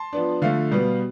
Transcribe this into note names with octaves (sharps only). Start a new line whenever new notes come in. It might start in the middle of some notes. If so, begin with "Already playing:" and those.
Already playing: A5 C6
F3 B3 D4
D3 F3 A3 F5
B2 G3 B3